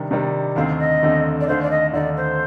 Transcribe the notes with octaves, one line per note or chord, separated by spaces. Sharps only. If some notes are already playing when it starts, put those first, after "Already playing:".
Already playing: C3 D#3 G3 D4
C3 D#3 G3 D4
D#2 D3 A3 C4 D#4 F5
D#5
D#2 D3 A3 C4 D#4
D5
D#2 D3 A3 D#4 C5
D5
D#5
D#2 D3 A3 D#4 D5
C5